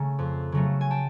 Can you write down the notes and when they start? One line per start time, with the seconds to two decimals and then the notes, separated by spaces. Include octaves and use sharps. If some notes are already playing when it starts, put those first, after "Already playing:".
Already playing: C#3 A3 G#5 A#5
0.19 F2
0.52 C#3 F#3 A3
0.81 G#5
0.90 G5 A5